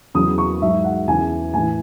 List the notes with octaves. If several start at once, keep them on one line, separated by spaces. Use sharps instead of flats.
E2 C#3 F#3 D#6
C#6
G#2 F#3 E5
F#5
E2 C#3 E3 G#5
A2 E3 G#5